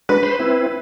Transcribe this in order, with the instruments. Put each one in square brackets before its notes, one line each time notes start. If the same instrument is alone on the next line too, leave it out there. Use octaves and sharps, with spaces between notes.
[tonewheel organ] G#3 D4 F#4 [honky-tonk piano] B4
[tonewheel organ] C5 B5 C6
C4 E4